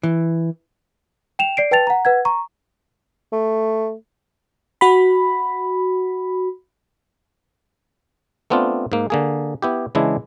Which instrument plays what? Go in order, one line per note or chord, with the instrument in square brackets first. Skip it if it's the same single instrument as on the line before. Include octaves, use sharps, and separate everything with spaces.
[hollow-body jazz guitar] E3
[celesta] G5 E7 F7
D5 C7 D7
B4 G5 A5 A6 F7
F#5 A#5
B4 F#5 G#6
A#5 C#6
[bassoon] A3
[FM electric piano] F#4 B5
[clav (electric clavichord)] A3 B3 C4 D4 F4
G#2 A#3
D3 A#3 G#4
B3 E4 G4
C#3 E3 G#3 D4 E4